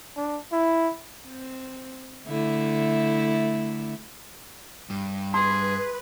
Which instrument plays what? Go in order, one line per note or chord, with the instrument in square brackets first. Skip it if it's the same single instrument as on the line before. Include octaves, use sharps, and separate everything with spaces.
[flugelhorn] D4
E4
[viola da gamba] C4
D3 A3 E4
[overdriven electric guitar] G2
[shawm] G#4 [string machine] B4 [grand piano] C6